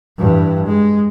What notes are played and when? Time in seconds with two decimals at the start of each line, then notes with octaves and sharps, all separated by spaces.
0.18 G2 E3
0.66 G#3